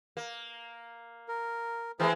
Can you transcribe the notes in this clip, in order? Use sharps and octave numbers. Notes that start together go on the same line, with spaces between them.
A#3
A#4
E3 G#3 A3 C4 G#4 A#4